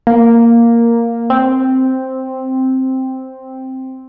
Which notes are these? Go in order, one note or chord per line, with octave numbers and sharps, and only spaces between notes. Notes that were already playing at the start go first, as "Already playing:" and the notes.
A#3
C4